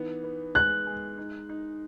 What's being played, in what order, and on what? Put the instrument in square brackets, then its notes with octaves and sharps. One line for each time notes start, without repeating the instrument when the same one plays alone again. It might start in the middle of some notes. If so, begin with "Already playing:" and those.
Already playing: [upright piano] E3 B3 D#4
B3
[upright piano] G#3 [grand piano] F#6
[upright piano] G#3
D#4
D#4